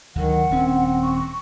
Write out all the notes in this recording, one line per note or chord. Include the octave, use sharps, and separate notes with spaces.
D2 D3 D#3 F#3 F#5
D#1 C4 C#4
C#6